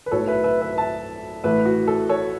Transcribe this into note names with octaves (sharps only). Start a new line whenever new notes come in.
B4
B1 A2 F#3 A4 C#5
B4 E5
B4 E5
B4 E5
E5 A5
A1 A2 A3 B4 E5
F#4
A4
A4 C#5